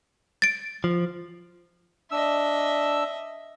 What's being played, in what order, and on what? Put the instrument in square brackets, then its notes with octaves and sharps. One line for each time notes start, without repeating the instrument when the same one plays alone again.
[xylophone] A6 D7
[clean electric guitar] F3
[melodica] D4 E6 [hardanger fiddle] D#5 E5